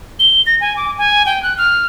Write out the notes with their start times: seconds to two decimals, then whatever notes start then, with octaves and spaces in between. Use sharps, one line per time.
0.19 G7
0.46 A#6
0.61 G#5
0.77 D6
0.98 G#5
1.26 G5
1.43 F#6
1.58 F6